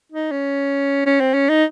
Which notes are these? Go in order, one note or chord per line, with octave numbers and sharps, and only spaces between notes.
D#4
C#4
C#4
C4
C#4
D#4